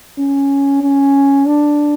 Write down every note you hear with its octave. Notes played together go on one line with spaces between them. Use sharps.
C#4
C#4
D4